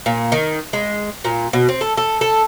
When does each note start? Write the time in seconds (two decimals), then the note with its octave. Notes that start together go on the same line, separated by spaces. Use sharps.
0.06 A#2
0.32 D#3
0.73 G#3
1.24 A#2
1.53 B2
1.69 C4
1.81 A4
1.97 A4
2.21 A4